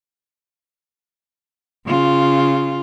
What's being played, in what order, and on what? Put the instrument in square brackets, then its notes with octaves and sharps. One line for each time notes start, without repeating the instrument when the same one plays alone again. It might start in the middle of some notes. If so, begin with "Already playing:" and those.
[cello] C#3 F4